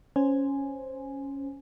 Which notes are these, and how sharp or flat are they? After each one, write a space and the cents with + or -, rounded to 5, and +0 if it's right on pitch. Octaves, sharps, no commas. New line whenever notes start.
C#4 -5 C5 +0 G#5 +0